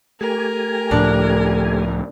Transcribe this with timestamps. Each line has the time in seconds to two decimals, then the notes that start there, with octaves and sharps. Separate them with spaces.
0.21 A3 G4 A#4 G#5
0.91 C#2 A2 F3 D4